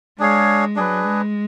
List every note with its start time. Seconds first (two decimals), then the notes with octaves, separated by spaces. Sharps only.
0.19 G#3 D4 G#4 C#5 F5
0.76 F#3 D4 G#4 B4
1.04 G#3